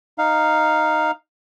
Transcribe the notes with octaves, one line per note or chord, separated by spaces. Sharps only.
D#4 F5